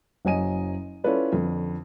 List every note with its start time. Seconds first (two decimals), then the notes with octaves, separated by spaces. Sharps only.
0.25 F#1 F#3 D#5 G#5 D#7
1.04 C#4 E4 F4 A4 B4 D5
1.33 F2 D3